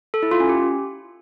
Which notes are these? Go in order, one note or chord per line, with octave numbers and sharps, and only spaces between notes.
A4
E4
F4
C#4
G4